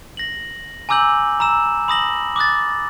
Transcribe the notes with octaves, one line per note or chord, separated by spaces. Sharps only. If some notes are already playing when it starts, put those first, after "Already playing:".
A#6 F#7
G#5 A#5 D6 E6 G6 F#7
A#5 B5 E6 E7
B5 D#6 A#6 F#7
D6 D#6 F#6 A6